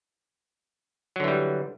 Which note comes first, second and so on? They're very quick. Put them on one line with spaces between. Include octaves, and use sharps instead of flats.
F#3 D3 E3 G3